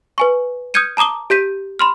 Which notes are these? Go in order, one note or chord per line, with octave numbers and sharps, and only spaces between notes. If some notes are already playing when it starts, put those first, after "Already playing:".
B4 G#5 C#6
D#6 F6 G6 G#6 C#7 D#7
A5 A#5 D6 D#6 G7
G4 G6 B6 D#7
B5 C6 F6